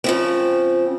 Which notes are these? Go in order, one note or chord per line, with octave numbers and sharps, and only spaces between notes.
C#3 F3 C4